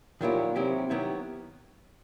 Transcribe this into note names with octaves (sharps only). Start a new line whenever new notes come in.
A#2 D#3 F#3 B3 E4 G4
C3 D#3 F#3 B3 E4 G4
D#3 F#3 B3 E4 G4